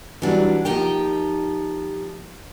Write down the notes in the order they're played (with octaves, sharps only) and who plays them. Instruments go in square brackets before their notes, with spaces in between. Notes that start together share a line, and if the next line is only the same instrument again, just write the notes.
[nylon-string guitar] E3 G3 [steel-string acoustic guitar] F#3 D4
[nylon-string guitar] F3 A#3 [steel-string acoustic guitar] D#4 G4 G5